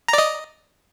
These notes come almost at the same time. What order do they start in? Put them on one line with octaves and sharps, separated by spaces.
A#5 D5 D#5